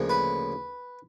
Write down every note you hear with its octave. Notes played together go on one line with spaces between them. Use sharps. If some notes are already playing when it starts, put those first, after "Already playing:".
Already playing: D2 C#3 F3 A#3
B4